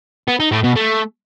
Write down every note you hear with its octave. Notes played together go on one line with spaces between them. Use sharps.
B3
D#4
A2
B2
A3